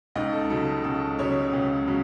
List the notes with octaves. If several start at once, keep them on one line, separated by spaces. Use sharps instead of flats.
C#2 D#4 D#5
A4
C#3 F#3 A4
C#2 A4
C#3 F#3 C#4 C#5
C#2
C#3 F#3